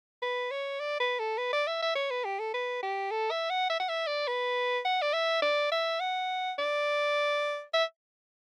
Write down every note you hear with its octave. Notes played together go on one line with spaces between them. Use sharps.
B4
C#5
D5
B4
A4
B4
D5
E5
E5
C#5
B4
G4
A4
B4
G4
A4
E5
F#5
E5
F#5
E5
D5
B4
F#5
D5
E5
D5
E5
F#5
D5
E5